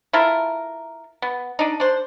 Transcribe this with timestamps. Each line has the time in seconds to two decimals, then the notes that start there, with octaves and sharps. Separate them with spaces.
0.13 E4 F4 A4 A#4
1.22 B3
1.59 D4 D#4
1.80 D4 C5